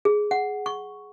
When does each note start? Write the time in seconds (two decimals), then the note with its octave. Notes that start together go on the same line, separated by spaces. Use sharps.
0.05 G#4
0.31 F#5
0.66 C#6